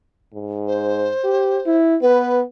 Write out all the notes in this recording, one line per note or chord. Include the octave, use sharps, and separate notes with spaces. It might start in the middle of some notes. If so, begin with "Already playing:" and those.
G#2
C5
G4
E4
B3 B4